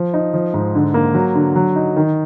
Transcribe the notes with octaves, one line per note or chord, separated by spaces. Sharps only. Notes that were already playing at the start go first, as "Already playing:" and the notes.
Already playing: F3
D#4
F3
G#2
D3
A#3
F#3
D3
F#3
D#4
D#3